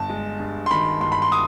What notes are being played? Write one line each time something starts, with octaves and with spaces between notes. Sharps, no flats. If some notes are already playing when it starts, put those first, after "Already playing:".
Already playing: G1 A5
G#3
G2
C6
D#3 B5
G1 C6
B5
C6
D#6